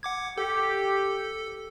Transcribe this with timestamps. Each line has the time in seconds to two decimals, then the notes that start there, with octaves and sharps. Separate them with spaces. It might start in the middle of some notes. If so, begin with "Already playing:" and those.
0.03 F#5 D6 G#6
0.38 G4 A4